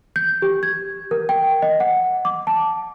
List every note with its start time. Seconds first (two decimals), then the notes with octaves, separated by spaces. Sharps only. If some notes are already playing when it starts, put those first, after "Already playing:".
0.16 G6
0.42 G4
0.63 G#6
1.11 A#4
1.29 G5
1.62 D#5
1.80 F#5
2.25 D6
2.47 A5